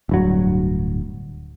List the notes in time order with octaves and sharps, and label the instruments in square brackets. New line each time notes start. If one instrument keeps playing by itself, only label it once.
[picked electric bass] D1 G2 F#3